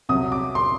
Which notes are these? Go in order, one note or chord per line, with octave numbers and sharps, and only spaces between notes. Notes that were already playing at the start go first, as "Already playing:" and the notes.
C2 C3 F#3 D#6
D6
C6